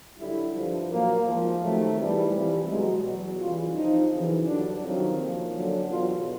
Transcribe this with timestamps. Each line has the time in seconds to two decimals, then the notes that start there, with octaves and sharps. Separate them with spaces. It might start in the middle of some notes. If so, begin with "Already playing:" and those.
0.19 F#2 D3 G3 E4
0.55 G2 D3 F3
0.89 A#2 F#3 A#3
1.25 G#2 F3
1.61 F2 C3 D#3 F#3 A3
1.97 G#2 E3 G3
2.32 F2 C3 E3 G3
2.68 B2 F#3 G#3
3.03 E2 B2 F#3
3.39 F#2 C#3 E3 G3 F4
3.75 F2 C3 F3 D#4
4.12 F#2 C#3 E3
4.46 G2 D3 F#3 D4
4.82 F2 C3 D#3 F#3
5.18 A#2 F3
5.53 F#2 D3 F#3
5.90 E2 B2 F#3 F4